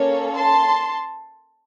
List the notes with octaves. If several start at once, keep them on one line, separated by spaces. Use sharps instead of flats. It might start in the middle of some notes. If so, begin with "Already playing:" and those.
Already playing: A#3 C#4 A4 C#5
A5 C6